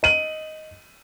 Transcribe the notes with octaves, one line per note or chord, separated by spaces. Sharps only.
D#5 D#7 F#7